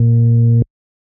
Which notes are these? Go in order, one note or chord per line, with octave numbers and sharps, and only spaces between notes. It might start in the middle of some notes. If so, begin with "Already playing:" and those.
Already playing: A#2